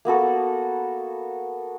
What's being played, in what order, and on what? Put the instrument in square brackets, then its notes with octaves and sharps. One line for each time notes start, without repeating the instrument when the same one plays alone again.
[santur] A#3 B3 F#4 A4